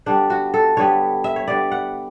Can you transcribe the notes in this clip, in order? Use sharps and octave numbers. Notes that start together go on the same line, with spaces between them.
D3 G3 B3 D4
F#4
A4
D3 G3 B3 C#5
E5
C#5
D3 G3 B3 D5
F#5